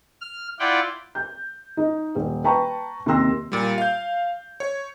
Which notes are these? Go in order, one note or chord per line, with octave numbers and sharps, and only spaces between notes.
F6
E4 F4 D5 F#5 G5
G6
D#4
D#1
B4 G5 A5 A#5 C#6
D#2 C3 C6 E6 A#6
A#2 G3
F5 G6
C#5